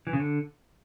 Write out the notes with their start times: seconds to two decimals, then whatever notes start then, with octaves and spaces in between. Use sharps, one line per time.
0.07 E3
0.13 C#3
0.20 D3